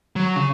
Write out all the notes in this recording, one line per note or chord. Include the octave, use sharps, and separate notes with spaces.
F#3
C#3